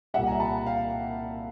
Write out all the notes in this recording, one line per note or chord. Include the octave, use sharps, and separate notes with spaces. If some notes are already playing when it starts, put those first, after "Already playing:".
C2 A#2 G3 E5 F#5
G#5 A#5
A5 B5
F5 G5